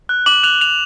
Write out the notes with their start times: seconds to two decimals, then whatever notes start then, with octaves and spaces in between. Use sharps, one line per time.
0.09 F#6
0.26 D6 F#7
0.44 F#6 F7
0.61 F#6 F7